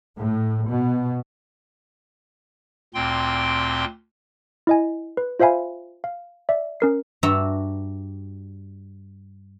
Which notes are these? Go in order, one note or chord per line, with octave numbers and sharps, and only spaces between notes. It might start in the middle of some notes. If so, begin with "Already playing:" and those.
A2
B2
D2 A#2 C4 G5 C6
E4 D#5 G#5
B4
F4 C5 E5 F5 G#5 B5
F5
D5 E5
C#4 A#4 C7
G2 F#4 E5 A#5